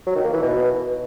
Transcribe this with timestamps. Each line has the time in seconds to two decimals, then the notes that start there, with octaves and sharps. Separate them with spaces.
0.07 F#3
0.15 D#3
0.24 A#3
0.33 E3
0.42 B2